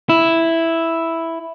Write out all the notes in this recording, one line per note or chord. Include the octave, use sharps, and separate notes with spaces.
E4